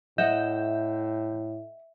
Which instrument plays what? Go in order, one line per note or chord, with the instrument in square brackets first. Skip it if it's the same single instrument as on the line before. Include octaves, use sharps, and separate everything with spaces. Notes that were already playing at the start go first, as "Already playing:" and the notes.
[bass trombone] A2 [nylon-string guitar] D#5 F#5 [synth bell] E5 [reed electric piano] G6